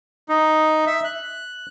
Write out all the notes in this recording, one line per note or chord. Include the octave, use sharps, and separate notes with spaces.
D#4
E5
F#6